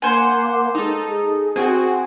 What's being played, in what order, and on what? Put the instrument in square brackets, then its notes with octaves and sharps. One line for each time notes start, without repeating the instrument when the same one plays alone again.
[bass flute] A#3 [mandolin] C5 G#5 [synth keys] F#5 C6
[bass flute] G#3 [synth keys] D#4 A4
[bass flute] G#4
[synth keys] C4 F#4 [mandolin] G#5